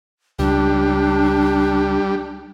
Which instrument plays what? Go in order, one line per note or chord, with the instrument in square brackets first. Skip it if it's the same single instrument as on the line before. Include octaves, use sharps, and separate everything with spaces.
[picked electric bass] C#2 [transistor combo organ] G3 [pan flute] D4